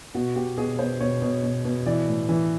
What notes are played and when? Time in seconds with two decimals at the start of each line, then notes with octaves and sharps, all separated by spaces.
0.15 B2 F#4
0.36 B2 G4
0.58 B2 G#4
0.79 B2 C5
1.01 B2 C#5
1.22 B2
1.43 B2
1.65 B2
1.86 E3 D5
2.08 A2
2.29 E3